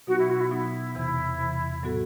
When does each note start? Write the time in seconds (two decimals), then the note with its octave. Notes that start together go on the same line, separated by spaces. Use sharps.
0.07 B2 F#3 B3 D#4 F#4
0.18 E4
0.29 F#4
0.40 E4
0.51 B2 F#3 B3 D#4 E4
0.95 E2 C3 E3
1.39 E2 C3 E3
1.83 A2 F#3 B3 F#4 A4